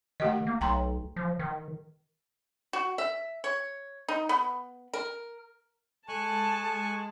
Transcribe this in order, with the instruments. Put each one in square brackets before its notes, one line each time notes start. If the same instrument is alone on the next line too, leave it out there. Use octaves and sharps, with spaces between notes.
[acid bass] D#3 [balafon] A3 G4 D#5
[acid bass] A#3
[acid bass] B1 [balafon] G5 A#5 C6
[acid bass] F3
D#3
[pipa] F#4
E5
C#5
D#4
B3
A#4
[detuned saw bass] G#3 [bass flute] A4 [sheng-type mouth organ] G#5 C#6 F#6 [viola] A5